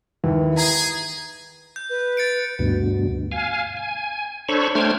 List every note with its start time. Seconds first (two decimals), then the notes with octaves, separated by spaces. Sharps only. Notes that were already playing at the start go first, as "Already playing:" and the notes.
0.24 D#2 E3
0.57 G#4 A#5
1.76 G6
1.90 B4
2.17 A6 C#7 D7
2.59 D2 G2 B2
3.32 F5 G#5
3.77 G#5
4.48 D4 A4 C5 C#5 B5 C#6
4.75 A3 D4 C5 G5 F6 G#6